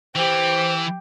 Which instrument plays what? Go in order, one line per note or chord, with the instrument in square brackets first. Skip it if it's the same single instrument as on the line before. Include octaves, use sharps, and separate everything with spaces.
[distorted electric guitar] E3 [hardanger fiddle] G4 [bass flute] C5